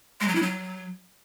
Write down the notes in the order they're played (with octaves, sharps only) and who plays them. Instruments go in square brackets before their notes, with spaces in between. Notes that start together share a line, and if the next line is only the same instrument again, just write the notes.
[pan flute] G#3
F#3
E4
F#3